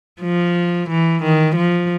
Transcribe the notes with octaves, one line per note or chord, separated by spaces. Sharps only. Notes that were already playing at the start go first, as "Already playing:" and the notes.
F3
E3
D#3
F3